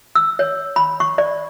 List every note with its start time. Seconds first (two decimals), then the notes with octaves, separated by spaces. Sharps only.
0.15 E6
0.39 C#5
0.76 B5
1.00 C#6
1.18 D5